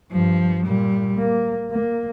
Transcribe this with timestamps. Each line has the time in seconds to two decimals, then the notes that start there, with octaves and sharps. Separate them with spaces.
0.12 G2 F3
0.65 A#2 G3
1.18 A#3
1.72 A#3